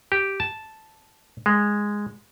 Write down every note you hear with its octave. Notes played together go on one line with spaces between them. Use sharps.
G4
A5
G#3